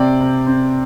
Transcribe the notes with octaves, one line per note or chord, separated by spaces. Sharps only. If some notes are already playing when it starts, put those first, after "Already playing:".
Already playing: C3 C4 D5 G5
C3
C4